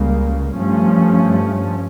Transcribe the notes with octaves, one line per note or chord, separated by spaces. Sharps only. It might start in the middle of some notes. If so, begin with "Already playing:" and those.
Already playing: C#2 C#3 G3 A#3
G2 F3 A3 C#4